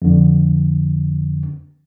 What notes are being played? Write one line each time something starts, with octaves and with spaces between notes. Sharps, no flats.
F2 D3